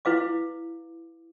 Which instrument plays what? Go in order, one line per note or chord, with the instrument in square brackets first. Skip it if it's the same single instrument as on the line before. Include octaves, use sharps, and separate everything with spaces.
[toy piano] E4 B4 F5 D6